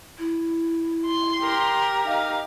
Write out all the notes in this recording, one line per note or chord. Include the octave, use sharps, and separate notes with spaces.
E4
C6
G4 A#4
D#4 F5